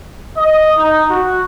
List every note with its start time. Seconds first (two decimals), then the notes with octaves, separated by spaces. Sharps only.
0.37 D#5
0.78 D#4
1.10 F#4